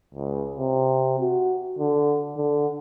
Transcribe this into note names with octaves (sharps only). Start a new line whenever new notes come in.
C#2
C3
F#4
D3
D3